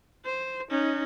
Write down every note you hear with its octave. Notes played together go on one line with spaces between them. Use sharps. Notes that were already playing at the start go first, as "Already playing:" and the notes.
C5
C#4 D#4